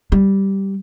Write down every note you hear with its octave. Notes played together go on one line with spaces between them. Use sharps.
G3